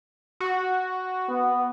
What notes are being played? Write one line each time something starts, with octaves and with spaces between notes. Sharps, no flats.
F#4
B3